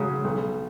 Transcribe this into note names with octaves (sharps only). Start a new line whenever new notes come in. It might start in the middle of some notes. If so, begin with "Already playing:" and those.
Already playing: F#2 C#3 F#3
B1